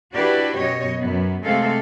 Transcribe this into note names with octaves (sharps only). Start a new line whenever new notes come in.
D4 E4 F#4 G4 B4 D5
F#2 B2 C#5 D#5
F#2 B3
C3 G#3 A3 C4 A4 F5